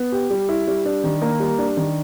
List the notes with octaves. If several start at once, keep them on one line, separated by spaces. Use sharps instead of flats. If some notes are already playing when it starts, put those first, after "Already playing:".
Already playing: B3
G4
G3
E4
G3
D4
D#3
A#3
G3
D4
D#3